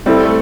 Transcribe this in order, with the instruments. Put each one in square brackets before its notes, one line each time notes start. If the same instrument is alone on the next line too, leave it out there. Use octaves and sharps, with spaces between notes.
[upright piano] G3 [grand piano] C4 E4 A4
[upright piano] A3